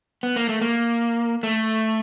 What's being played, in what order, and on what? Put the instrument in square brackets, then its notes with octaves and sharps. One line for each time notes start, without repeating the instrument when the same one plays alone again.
[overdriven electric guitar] B3
A#3
A3
A#3
A3